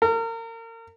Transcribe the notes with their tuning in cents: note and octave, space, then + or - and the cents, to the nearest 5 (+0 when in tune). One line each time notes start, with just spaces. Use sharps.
A#4 -35